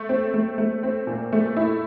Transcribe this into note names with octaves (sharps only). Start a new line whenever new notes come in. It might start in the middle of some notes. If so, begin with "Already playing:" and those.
Already playing: A3
C4
A3
A3
C4
A#2
A3
E4